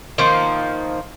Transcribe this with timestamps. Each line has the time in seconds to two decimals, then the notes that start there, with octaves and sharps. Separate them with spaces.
0.18 D#3 F3 A#3 C5